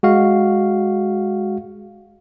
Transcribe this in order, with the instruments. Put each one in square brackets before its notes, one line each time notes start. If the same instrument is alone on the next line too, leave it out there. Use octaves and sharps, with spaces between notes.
[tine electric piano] G#3 F#4 F5